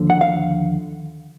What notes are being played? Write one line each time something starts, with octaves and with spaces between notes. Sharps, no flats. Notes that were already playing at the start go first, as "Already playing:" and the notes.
Already playing: D#2 D3 F3
F#5
F5